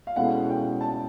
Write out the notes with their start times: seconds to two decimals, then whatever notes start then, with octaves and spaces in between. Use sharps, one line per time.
0.07 F5
0.16 B2 G#3 C#4 E4 A4 F#5
0.49 G5
0.81 A5